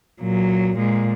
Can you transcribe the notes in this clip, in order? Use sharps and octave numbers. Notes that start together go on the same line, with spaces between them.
A#2 F#3
A#2 G#3